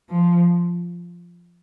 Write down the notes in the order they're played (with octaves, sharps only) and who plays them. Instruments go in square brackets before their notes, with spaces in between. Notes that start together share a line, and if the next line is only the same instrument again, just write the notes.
[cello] F3